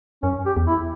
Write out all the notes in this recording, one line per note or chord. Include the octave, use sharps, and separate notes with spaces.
F#2 C#4
G4
E2
E4